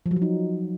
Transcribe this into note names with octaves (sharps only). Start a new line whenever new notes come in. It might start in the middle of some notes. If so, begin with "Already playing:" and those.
F3
F#3
F3
D#4